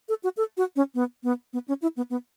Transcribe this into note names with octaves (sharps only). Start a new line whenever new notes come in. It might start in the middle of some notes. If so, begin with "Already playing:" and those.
A4
F#4
A4
F#4
C#4
B3
B3
B3
C#4
E4
B3
B3